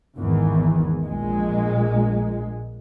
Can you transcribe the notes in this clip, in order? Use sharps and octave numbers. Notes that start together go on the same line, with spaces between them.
G#1 E2 D#3 E3
A#1 A#2 G#3